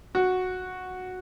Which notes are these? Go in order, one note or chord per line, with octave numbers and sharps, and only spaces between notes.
F#4